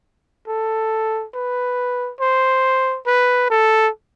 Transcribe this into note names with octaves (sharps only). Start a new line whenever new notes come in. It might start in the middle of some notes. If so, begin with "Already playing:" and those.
A4
B4
C5
B4
A4